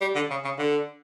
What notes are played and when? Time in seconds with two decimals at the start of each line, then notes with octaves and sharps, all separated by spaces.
0.01 G3
0.15 D3
0.30 C#3
0.44 C#3
0.59 D3